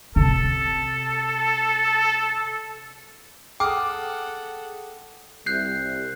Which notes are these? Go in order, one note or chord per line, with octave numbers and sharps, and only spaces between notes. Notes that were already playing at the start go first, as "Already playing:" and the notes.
C3 A4
G#4 A4 F#5 G5 D6 D#6 F6
C2 F#6 G6 C7